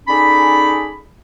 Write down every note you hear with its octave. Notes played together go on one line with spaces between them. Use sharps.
C#4 D#4 G#4 A4 D5 B5